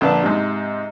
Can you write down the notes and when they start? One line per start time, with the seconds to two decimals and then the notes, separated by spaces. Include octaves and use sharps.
0.01 A#1 D3 D4 B4 A5
0.23 G#2 C3